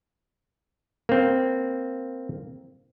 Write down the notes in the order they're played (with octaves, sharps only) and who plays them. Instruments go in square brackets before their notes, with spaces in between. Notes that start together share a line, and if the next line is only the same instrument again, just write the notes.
[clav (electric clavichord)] A#3 C4